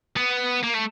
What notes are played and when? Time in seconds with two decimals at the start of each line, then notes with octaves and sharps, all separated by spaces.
0.17 B3
0.63 A#3
0.74 A3